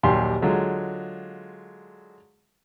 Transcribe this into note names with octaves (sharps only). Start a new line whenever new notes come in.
A#1 D#2 F#3 G4 G#5 C6
D3 F#3 G#3 F4